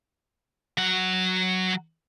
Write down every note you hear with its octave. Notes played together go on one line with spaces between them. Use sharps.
F#3 F#5